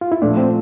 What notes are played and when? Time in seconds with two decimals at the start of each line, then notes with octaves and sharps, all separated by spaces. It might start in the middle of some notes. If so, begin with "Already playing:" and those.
0.01 F4
0.12 E4
0.22 A#2 F3 A3 D4
0.37 C4